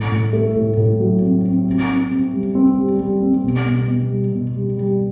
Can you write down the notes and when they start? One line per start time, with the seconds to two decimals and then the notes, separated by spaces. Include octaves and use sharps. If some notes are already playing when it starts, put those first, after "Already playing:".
Already playing: A2
0.12 A2
0.33 A3
0.56 A2
0.77 A2
1.00 F#3
1.22 C4
1.45 C4
1.66 C4
1.88 C4
2.11 C4
2.33 G3
2.55 C4
2.78 G3
3.00 G3
3.22 C4
3.44 B2
3.66 B2
3.88 B2
4.10 G3
4.32 B2
4.55 G3
4.77 G3